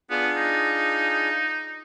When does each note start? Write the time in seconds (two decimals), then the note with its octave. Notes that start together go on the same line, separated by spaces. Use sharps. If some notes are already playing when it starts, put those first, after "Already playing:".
0.10 B3 D4 F4 G#4
0.36 D#4